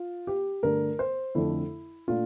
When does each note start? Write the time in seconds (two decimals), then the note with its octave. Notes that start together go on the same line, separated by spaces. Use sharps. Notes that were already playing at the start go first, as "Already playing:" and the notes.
Already playing: F4
0.27 G4
0.63 G2 D3 A3 A#4
0.99 C5
1.35 F2 D3 A3 D4 E4
2.08 A#2 A3 D4 F4